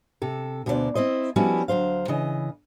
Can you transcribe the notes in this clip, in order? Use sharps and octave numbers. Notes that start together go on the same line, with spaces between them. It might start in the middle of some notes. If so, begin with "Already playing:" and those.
C3 A4
D2 B2 A#3 E4 C5 D5
C4 E4 C5 D#5
F3 G3 B3 C#4 E4 F#4
D2 F#3 C5 F5
C#3 E3 D#5